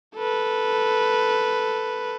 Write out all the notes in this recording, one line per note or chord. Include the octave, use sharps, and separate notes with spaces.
A4 B4